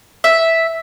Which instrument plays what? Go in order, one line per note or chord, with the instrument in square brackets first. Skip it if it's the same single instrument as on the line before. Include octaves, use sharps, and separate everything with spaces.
[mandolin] E5